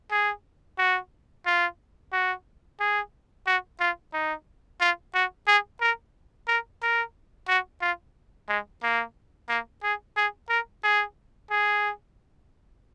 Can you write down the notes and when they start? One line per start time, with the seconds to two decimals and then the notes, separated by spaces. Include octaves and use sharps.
0.11 G#4
0.78 F#4
1.46 F4
2.12 F#4
2.80 G#4
3.47 F#4
3.80 F4
4.13 D#4
4.81 F4
5.15 F#4
5.47 G#4
5.81 A#4
6.48 A#4
6.82 A#4
7.48 F#4
7.81 F4
8.49 G#3
8.83 A#3
9.49 A#3
9.83 G#4
10.16 G#4
10.49 A#4
10.84 G#4
11.51 G#4